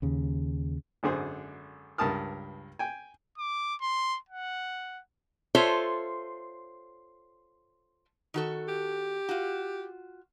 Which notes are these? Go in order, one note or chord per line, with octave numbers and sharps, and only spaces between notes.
D#2 C#3
G#1 F#2 D3 G#4 C5
C#2 G2 A#4 A5 D#6 F6
G5 G#5
D6
C6
F#5
F4 A4 C5 C#5 E5
D#3 F#4 A4
G4
F4 F#4